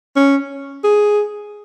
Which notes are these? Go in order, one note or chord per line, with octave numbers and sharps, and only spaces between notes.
C#4
G#4